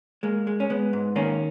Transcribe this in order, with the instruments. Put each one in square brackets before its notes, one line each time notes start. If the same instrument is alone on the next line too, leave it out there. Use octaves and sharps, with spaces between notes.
[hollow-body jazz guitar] G#3 A#3
G#3
C#4
G#3 B3
G#2
D#3 A#3 C#4